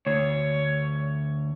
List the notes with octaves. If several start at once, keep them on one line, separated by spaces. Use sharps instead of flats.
D2 C#5